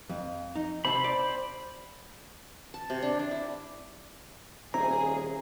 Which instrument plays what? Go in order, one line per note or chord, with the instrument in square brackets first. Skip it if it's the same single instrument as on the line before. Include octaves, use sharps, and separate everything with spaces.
[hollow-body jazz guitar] F2
D#4
[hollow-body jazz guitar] C3 A5 [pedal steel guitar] C5 B5
[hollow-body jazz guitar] D5
[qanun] A5
C3
D4
D4
E4
[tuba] D#1 [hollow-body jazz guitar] C4 E4 C#5 [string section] G#4 [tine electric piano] A#5